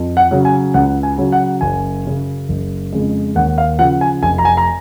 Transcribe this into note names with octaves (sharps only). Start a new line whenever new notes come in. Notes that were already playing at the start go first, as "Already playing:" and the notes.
Already playing: F2
F#5
C#3 F#3
G#5
C#2 F#5
G#5
C#3 F#3
F#5
F#1 G#5
F#2 C#3
F#1
F2 C#3 G#3
D#2 F#5
F5
C#3 F3 F#5
G#5
F1 G#5
A#5
G#5
A#5